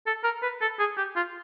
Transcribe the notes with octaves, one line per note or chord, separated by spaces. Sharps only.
A4
A#4
B4
A4
G#4
G4
F4